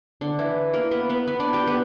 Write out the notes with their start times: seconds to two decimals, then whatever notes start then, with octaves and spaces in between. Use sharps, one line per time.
0.21 D3 D4
0.39 E3 E4
0.73 A#3 A#4
0.91 B3 B4
1.09 B3 B4
1.27 B3 B4
1.40 D4 D5
1.53 G4 G5
1.67 B3 B4